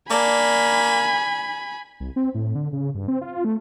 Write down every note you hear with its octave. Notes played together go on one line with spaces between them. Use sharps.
A#3 D5 G#5 A5 B5
C2
C4
A2
D3
C#3
G2
C4
F4
A3